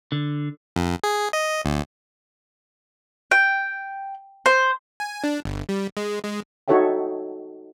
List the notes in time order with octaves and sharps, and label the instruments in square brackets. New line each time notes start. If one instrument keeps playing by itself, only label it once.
[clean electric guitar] D3
[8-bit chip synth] F2
G#4
D#5
D2
[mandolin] G5
C5
[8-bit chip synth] G#5
D4
G1
G3
G#3
G#3
[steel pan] D#4 F#4 A4 C#5 E5 G5